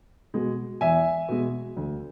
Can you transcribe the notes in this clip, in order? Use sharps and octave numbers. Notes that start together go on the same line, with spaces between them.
B2 G#3
E2 E5 G#5
B2 G#3
D2